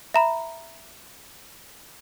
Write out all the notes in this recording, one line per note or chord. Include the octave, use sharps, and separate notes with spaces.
E5 A#5 B5